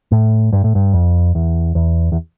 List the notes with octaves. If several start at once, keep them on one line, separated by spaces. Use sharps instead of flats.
A2
G2
A2
G2
F2
E2
E2
E2